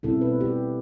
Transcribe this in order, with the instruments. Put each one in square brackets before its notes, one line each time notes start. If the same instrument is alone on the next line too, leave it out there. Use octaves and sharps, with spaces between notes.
[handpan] B2 G3 C4 E4 A4
B4
G4